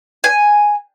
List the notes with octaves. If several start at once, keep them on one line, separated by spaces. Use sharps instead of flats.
G#5